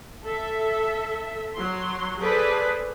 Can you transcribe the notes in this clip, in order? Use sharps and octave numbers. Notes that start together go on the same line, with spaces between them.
A4 E5
F#3 C6
G#4 A4 B4 C5 D5